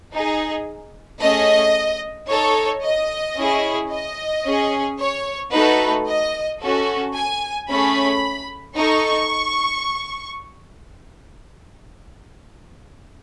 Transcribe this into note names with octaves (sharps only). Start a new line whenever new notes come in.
D#4 G#4
A3 C#4 G#4 D#5
D#4 A4 C#5
D#5
C#4 E4 G#4
D#5
C#4 G#4
C#5
A3 D#4 F#4 A4 B4
D#5
C#4 F#4 A4
G#5
A3 C#4 G#4 B5
D#4 A4 C#6